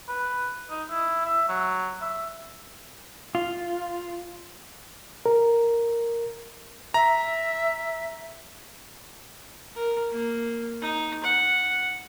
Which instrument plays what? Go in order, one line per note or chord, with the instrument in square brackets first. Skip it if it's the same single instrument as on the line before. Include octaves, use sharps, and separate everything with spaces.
[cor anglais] B4
D#4
E4
E5
F#3
E5
[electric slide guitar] F4
[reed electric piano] A#4
[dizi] E5 [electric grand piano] A#5
[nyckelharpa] A#4
A#3
D#4
F#5